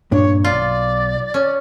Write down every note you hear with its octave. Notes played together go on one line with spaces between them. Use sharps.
G2 A#2 D4 C#5
B1 F4 D5 C6
C#4